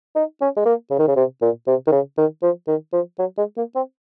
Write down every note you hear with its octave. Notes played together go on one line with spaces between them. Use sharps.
D#4
C#4
G#3
A#3
C#3
D#3
C#3
C3
A#2
C3
D#3
C#3
D#3
F3
D#3
F3
F#3
G#3
A#3
C4